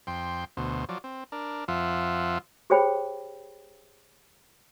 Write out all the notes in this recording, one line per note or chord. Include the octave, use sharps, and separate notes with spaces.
F2 G5 C6
D2 B2 C5
F3 F#3 D5
C4
D4 A#4
F2 F3 F4 E5 F#5
G4 G#4 C5 C#5 G5 B5